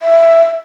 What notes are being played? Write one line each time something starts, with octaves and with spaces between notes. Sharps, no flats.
E5